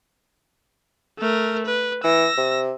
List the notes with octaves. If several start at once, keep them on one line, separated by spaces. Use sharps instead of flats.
A3 A#4
B4
E3 E6 A#6
C3